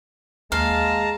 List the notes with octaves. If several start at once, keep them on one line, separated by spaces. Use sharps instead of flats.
D#2 G#3 F5 A5 A#5